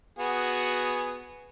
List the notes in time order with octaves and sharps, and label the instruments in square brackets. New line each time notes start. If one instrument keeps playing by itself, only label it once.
[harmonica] B3 F#4 G#4